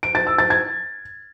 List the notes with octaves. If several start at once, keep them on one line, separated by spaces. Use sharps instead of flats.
D7
A6
E6
A6
G#6